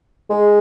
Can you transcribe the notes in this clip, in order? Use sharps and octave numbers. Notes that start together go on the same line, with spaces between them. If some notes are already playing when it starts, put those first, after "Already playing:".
G#3